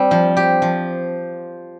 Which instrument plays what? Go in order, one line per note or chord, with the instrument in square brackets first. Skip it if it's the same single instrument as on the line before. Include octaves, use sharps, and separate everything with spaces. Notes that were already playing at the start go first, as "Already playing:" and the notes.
Already playing: [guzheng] G3 C4
F3
G4
F3